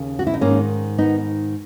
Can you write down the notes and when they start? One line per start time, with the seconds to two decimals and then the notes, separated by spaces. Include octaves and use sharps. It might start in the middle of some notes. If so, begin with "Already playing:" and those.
Already playing: D#2 C#3
0.19 F#4
0.27 E4
0.34 D#4
0.41 G#2 D#3 A#3 C#4
0.98 B3 D#4